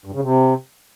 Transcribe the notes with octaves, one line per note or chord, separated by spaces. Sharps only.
G2
C#3
C3